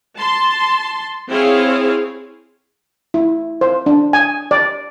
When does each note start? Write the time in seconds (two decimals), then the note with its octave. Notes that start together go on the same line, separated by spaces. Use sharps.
0.17 A5 C6
1.28 C4 E4 G#4 C#5 F5
3.14 E4
3.61 C5
3.86 D4
4.13 G#5
4.51 D5